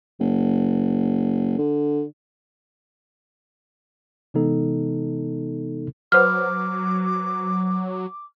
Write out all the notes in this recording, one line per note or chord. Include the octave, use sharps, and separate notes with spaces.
F#1
D3
C3 E3 G#3 B3 D#4 A4
F#3 F#4 B4 C5 D6 F6